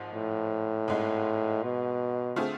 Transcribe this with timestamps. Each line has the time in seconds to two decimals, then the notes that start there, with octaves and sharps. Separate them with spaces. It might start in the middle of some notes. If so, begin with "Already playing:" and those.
Already playing: G#1 G#2 F3
0.14 A2
0.88 G#1 G#2 G#3
1.63 B2
2.36 D3 A3 C4 F4 G#4